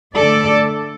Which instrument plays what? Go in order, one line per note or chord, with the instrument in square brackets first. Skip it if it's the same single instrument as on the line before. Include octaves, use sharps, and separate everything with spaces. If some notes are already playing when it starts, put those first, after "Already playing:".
[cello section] D3 A3 A4 D5